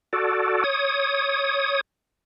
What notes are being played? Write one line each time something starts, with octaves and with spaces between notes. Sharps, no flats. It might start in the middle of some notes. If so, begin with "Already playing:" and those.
F#4 A4 D5
C#5 D#6